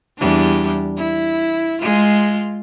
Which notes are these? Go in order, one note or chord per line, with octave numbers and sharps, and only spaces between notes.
E2 G3 D4
E4
G#3 F4